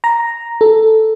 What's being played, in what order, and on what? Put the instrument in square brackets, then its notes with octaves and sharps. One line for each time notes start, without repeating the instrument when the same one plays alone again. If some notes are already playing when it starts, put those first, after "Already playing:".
[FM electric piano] A#5
A4